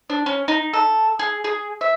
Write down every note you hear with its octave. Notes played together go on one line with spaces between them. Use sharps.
D4
C#4
D#4
A4
G#4
G#4
E5